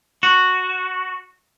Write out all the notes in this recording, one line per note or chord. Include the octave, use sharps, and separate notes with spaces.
F#4